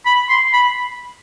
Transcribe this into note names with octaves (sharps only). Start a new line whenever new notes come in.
B5
C6
B5